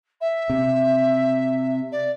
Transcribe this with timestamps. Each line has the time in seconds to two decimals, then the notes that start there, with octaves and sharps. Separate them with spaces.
0.21 E5
0.50 C3
1.92 D5